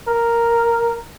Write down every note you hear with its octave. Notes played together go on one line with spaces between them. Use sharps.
A#4